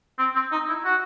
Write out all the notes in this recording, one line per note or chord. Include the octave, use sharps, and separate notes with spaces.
C4
C4
D#4
E4
F#4